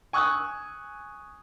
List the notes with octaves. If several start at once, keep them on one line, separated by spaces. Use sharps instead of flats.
G#5 C#6 D#6 E6 F#6